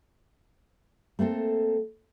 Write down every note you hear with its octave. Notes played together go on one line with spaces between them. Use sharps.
A3 A#3 C4 A4